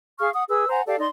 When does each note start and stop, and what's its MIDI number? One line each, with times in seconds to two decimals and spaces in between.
0.19 0.29 68
0.19 0.29 77
0.19 0.29 85
0.19 0.29 89
0.33 0.44 78
0.33 0.44 87
0.49 0.68 68
0.49 0.68 71
0.49 0.68 88
0.69 0.81 72
0.69 0.81 78
0.69 0.81 80
0.69 0.81 82
0.86 0.97 67
0.86 0.97 69
0.86 0.97 74
0.86 0.97 77
0.98 1.07 63
0.98 1.07 74
0.98 1.07 84